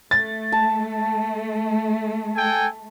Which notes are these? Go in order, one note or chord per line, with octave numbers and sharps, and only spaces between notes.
A3 A6
A5
A4 G5 G#5